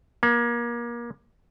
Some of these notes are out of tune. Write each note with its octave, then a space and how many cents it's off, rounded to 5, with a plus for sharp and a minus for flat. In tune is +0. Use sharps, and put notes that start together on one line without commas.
A#3 +30